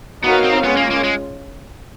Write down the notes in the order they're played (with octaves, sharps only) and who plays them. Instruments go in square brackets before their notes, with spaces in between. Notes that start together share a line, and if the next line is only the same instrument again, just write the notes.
[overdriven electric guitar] B3 [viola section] D#4 F#4 A#4 C#5 F5
[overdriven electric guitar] C4
[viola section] G#3 C#4 F4 [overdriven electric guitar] B3
[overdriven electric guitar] A#3
A#3
G#3